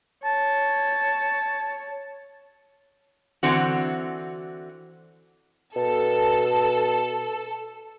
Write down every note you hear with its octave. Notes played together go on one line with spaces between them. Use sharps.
C#5 A5
D3 E3 C4 F#4
B2 A4